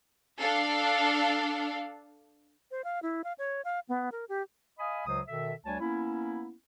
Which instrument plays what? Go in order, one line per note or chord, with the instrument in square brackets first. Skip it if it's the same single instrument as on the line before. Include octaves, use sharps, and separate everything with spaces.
[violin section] D4 A4 F5
[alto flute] C5
F5
E4
F5
C#5
F5
B3
A#4
G4
[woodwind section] D#5 F5 G#5 B5 D#6
C#2 C#3 F#3 G#3 C5 D#6
B2 D#3 A4 E5
D2 G3 D4 C#5 G#5 A5
A#3 B3 C#4 E4